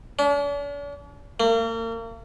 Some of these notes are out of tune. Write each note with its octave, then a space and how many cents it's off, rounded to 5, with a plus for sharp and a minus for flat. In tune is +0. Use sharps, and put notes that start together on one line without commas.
D4 -45
A#3 -40